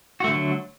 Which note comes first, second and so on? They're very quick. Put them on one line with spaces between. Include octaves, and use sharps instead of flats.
F#4 A3 D3 F#3